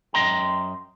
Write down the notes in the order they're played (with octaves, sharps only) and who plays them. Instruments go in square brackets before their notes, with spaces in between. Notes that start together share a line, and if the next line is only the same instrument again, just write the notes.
[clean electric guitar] F#2 D#5 G5 A#5 C6